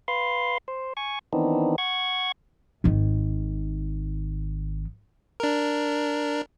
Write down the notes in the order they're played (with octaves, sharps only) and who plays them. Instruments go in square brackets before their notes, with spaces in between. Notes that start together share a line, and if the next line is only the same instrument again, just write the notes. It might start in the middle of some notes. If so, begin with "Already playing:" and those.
[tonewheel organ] B4 F5 C6
C5
G#5 C#6
D#3 E3 B3 C4 D4 D#4
F#5 C#6 G#6
[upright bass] G#1 D#3
[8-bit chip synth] D4 A#4